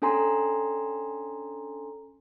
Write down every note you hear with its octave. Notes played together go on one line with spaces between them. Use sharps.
C#4 D4 A4 G#5 A#5 C6